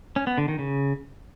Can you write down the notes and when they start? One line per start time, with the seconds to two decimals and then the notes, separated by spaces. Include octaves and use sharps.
0.16 C#4
0.27 B3
0.38 D3
0.48 D#3
0.59 C#3